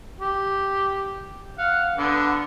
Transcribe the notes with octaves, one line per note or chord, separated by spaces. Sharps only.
G4
F5 F#5
D3 B3